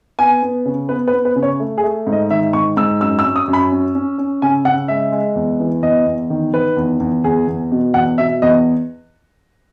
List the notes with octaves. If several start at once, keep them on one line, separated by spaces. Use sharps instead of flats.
B3 G#5
B3
C#3
B3 B4
B4
B3
B4
C#3
C#5
A3
G#4
A3
G#2
D#5
D#3 E5
G#2 C#6
G#2 E6
F#2 E6
E6
C#4
D#6
F#2
B5
C#4
C#4
C#4
C#3 G#5
C#3 F#5
G#3 E5
G#3
E2
E3
E2 D#5
E2
D#3
D#3 B4
E2
E2
E2 G#4
E2
B2
E2 F#5
B2 E5
E2 D#5